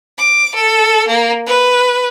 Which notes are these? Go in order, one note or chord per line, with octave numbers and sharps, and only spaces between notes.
D6
A4
A#3
B4